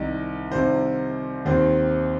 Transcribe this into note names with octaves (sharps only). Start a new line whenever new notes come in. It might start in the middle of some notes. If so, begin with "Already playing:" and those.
Already playing: C2 C3 D#3 D#5
C2 C3 D#3 C5
D#2 D#3 C4 C5